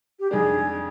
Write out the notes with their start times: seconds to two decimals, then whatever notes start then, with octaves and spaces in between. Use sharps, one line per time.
0.20 G4
0.31 F2 D#3 G#3 D4 G#4